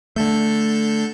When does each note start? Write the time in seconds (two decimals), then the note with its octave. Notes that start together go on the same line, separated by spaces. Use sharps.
0.16 D3 A3 A4 G6